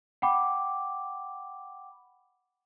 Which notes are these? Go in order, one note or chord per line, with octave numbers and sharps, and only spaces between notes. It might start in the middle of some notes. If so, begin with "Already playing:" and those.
F#5 G5 B5 D6